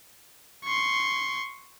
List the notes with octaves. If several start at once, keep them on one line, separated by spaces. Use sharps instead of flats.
C6 C#6